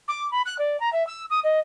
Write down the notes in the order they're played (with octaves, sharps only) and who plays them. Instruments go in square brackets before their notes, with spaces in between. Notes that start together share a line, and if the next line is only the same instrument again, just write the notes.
[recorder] D6
B5
F#6
D5
A#5
E5
E6
D#6
D#5